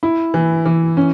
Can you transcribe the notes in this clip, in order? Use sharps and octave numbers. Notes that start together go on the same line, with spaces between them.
E4
E3
E3
C#4